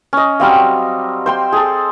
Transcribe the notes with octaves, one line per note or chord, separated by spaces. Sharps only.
C#4 D#5
F#3 G3 C4 F5
C5 G5 C6
G#4 A4